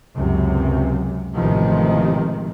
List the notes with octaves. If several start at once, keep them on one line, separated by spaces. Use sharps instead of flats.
C#2 F#2 C3
A1 A2 C3 D#3 F3 G#3